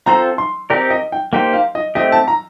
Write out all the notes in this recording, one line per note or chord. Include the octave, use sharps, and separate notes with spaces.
C4 F4 A4 C5 A#5
C6
C4 D#4 G4 A#4 D5
D#5
G5
A#3 D#4 G4 C5 G5
F5
D#5
A3 C4 G4 D#5
A5
A#5